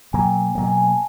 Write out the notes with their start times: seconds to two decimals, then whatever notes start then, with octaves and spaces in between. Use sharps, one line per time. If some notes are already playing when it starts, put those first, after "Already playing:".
0.13 B2 F#3 A#3 G#5
0.21 G5
0.28 G#5
0.55 B2 F#3 A#3
0.66 G#5
0.77 G#5
0.88 A5